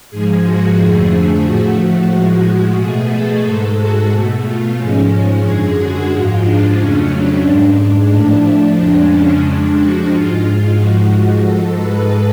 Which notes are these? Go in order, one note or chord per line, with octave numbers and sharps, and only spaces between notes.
G#2 F3 G#3 G#4
F#4
F2 D3 F3 A3 G#4
G#4
A2 F3 A3 F#4
F#4
A2 F3 G#3
B2 A3 G#4
A4
G#2 G#3 A4
F#4
B2 A3
F4
G#2 F3 G#3 C#4
F#2 D3 G#3 G#4
F#4
G#2 F3 G#3 F4
D4
F2 C#3 F#3 A3 C#4
D4
G#2 G#3 D4
D4
A2 F3 A3 D4
F2 C#3 F3 G#3
C#4
F2 F3 G#3 D4
F#4
G#2 G#3 F4
G#2 F3 G#3 F#4
F#4
G#2 G#3 A4
B4